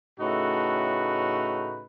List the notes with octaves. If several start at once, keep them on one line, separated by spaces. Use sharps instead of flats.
A2 C#3 A3 D#4 F#4 B4